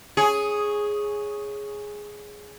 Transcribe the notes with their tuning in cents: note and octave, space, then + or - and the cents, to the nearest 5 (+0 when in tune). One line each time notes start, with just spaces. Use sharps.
G#4 +0 C#5 +0